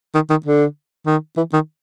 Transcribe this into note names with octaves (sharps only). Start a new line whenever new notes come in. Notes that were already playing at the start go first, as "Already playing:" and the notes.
D#3
D#3
D3
D#3
E3
D#3